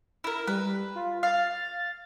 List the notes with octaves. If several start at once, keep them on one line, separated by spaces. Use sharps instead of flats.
E4 A#4
G3 B4
F4
F5 A6